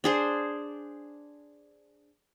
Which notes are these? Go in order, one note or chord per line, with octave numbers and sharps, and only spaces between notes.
D4 G#4 C5